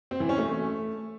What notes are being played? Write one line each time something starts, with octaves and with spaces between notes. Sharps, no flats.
C4
E3
C#4
A3